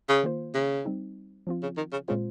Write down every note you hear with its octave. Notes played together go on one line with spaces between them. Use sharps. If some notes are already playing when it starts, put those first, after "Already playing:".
C#3
D#3 A#3 F4 C5
C#3
G3 C4 D#4
F3 C4 F4
C#3
D#3
C#3
A#2 C#3 G#3 C4 F4 C5